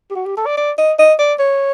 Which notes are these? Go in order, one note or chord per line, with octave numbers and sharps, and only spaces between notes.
G4
F#4
G4
A4
D5
D5
D#5
D#5
D5
C#5